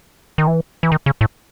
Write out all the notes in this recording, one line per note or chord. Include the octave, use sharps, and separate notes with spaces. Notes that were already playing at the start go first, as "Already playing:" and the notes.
D#3
E3
E3
D#3
C#3
A2